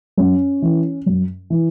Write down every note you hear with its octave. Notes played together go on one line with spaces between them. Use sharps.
F#2 C#4
E3
F#2
E3